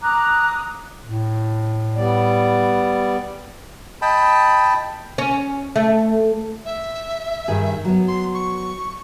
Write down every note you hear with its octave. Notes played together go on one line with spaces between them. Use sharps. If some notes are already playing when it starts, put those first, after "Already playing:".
A#5 D6 D#6 F#6
A2
G3 B3 D5
D#5 G5 A5 B5
C#4
A3
E5
G2 D#3 G#4
F#3 B3
C6
C#6